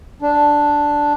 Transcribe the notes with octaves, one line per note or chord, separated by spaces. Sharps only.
D4